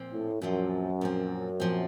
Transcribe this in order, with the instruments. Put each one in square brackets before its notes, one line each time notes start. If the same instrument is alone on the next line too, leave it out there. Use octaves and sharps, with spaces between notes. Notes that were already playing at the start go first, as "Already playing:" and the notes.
Already playing: [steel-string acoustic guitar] A#2 F3 C4
[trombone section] A2
[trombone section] F#2 [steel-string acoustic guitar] A#2 F3 C4
[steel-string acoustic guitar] A#2 F3 C4
A#2 F3 C4